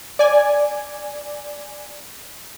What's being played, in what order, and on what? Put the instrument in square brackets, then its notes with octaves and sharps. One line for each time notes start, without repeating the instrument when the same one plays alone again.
[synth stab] D5 G#5